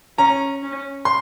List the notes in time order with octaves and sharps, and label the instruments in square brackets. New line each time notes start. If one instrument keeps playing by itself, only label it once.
[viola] C#4 [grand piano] A#5
[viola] C#4
[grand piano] C6